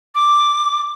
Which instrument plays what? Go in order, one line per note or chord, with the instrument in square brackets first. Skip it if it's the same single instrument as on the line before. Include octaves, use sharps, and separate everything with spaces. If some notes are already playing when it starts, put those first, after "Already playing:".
[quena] D6